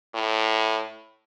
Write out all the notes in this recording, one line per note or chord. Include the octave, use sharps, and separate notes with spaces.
A2